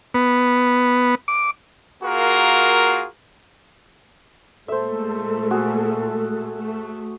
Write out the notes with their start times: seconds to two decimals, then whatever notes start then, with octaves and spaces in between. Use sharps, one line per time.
0.14 B3
1.28 D6
2.03 A#3 F4 F#4 G#4 A#4
4.68 A#2 G#3 A3 A4 C5 E5
5.51 F#4 G#4
6.56 A3